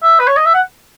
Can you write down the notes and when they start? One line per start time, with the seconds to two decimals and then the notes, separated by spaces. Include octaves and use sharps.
0.03 E5
0.19 B4
0.28 C#5
0.36 D#5
0.46 E5
0.54 F#5